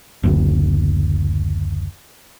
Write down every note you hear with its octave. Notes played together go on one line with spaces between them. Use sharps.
F#1 D2